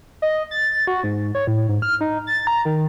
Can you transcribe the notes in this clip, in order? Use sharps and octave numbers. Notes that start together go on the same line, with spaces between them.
D#5
A6
F#4
G#2
C#5
A2
G#2
F6
D#4
A6
A#5
D#3